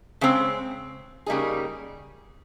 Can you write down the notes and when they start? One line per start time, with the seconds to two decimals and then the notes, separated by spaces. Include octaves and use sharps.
0.21 C#3 G#3 C4
1.26 C#3 G3 A#3 D#4 G#4